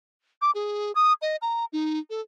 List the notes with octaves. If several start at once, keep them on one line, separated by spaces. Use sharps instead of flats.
D6
G#4
D#6
D#5
A#5
D#4
A4